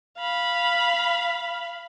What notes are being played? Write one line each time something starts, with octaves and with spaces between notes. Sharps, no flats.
F5 B5